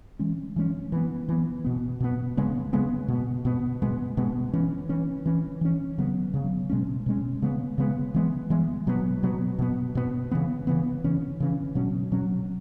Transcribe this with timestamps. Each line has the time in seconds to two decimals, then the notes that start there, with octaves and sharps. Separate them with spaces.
0.19 E3 G#3 C#4
0.56 E3 G#3 C#4
0.92 E3 B3
1.29 E3 B3
1.64 B2 B3
2.00 B2 B3
2.37 C#3 G#3 B3
2.73 C#3 G#3 B3
3.08 B2 B3
3.45 B2 B3
3.82 B2 G#3 B3
4.17 B2 G#3 B3
4.53 E3 C#4
4.89 E3 C#4
5.26 E3 C#4
5.61 E3 C#4
5.98 C#3 F#3 B3
6.34 C#3 F#3 B3
6.70 B2 G#3 C#4
7.06 B2 G#3 C#4
7.42 C#3 G#3 B3
7.78 C#3 G#3 B3
8.14 E3 G#3 B3
8.50 E3 G#3 B3
8.87 B2 F#3 B3
9.23 B2 F#3 B3
9.59 B2 B3
9.95 B2 B3
10.31 C#3 E3 B3
10.67 C#3 E3 B3
11.04 C#3 E3 C#4
11.40 C#3 E3 C#4
11.75 B2 F#3 C#4
12.12 B2 F#3 C#4